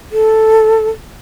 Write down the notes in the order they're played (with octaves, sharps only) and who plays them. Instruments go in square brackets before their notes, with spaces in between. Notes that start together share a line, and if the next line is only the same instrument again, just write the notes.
[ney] A4